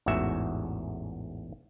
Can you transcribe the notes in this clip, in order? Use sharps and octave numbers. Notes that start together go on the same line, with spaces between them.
A1 E2 G#2 F#4 E5